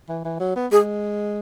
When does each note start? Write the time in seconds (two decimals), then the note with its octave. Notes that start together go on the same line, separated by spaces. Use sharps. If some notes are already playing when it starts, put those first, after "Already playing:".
0.09 E3
0.25 E3
0.40 F#3
0.56 B3
0.72 G#3 G#4